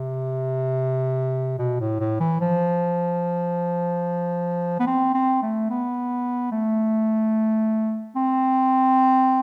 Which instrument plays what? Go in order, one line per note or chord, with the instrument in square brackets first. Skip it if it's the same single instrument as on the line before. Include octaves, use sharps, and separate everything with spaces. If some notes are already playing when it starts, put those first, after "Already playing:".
Already playing: [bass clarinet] C3
B2
A2
A2
E3
F3
B3
C4
C4
A3
B3
A3
C4